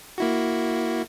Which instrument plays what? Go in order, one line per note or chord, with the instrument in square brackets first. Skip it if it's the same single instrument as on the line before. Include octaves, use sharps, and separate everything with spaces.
[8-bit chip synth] A#3 E4 F#4